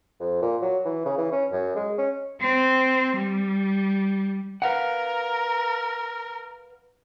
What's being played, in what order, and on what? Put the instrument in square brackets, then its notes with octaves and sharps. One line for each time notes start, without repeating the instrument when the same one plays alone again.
[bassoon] F2
A#2
F#3
E3
C#3
E3
C#4
F#2
G#3
C#4
[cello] C4
G3
[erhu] A#4 [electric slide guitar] B4 F5 F#5